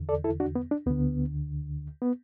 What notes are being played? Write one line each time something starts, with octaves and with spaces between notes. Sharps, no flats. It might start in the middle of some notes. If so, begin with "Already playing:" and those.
Already playing: E2 D3
A4 D5
E4 A4
D4 F#4
B3
D4
D2 D3 B3
B3